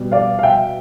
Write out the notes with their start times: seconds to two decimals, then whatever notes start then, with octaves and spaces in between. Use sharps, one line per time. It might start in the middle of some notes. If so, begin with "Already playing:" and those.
Already playing: B2 G3
0.12 D5 F5
0.39 F5
0.43 E5 G5